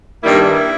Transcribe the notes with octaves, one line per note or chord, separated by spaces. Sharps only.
G2 D#3 G3 A#3 E4